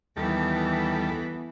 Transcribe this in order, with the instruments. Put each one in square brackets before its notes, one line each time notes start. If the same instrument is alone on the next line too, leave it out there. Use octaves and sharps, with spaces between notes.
[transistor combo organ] D#2 G3 A4 [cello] E3 B3